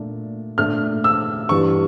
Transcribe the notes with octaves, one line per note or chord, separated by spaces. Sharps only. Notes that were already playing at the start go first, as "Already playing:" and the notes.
Already playing: A#2 A3 D4
A#2 A3 D4 F6
E6
G2 E3 G3 D4 C#6